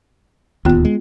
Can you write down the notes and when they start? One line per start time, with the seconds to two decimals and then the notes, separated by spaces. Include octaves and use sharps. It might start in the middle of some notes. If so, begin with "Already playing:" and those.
0.65 D1 D#2 B3 F4
0.85 G#3